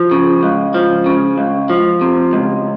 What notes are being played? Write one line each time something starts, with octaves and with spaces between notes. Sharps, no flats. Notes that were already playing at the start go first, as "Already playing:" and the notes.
Already playing: F3
C#3
C#2
F3
C#3
C#2
F3
C3
C#2